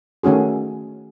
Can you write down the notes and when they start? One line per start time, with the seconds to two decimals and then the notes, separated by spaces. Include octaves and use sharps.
0.23 D#3 A3 C#4 F#4 G#4